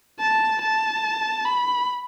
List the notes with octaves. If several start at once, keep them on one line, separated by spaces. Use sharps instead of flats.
A5
A5
B5